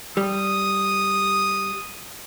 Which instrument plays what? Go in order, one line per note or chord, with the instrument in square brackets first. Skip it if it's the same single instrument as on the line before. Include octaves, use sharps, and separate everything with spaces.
[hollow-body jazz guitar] G3 [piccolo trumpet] D#6